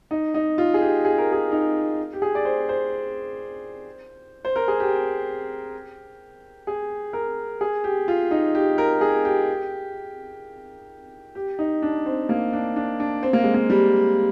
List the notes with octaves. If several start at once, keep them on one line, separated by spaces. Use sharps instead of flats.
D#4
D#4
F4
G#4
G4
G#4
A#4
G#4
D#4
G4
G#4
D5
C5
C5
C5
A#4
G#4
G4
G#4
A#4
G#4
G4
F4
D#4
G4
A#4
G#4
G4
G4
D#4
D4
C4
A#3
D4
D4
D4
C4
A#3
G#3
A#3
G3